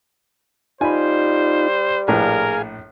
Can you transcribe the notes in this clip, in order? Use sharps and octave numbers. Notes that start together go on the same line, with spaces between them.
G3 D#4 F4 C5 G#5 B5
A#1 A2 G#4 A#4 B4 F5 G#5